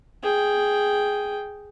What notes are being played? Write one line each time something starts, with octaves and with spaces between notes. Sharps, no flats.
G#4 G5